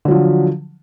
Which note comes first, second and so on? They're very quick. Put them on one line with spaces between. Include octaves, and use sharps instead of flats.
D3 F#3 F3